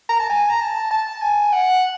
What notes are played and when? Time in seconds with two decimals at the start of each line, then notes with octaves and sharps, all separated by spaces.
0.09 A#5
0.20 A5
0.30 G#5
0.49 A#5
0.61 A5
0.91 A5
1.22 G#5
1.53 F#5